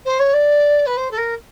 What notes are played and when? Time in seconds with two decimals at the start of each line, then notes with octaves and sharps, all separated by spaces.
0.05 C5
0.19 C#5
0.33 D5
0.86 B4
0.97 C5
1.11 A4
1.17 A#4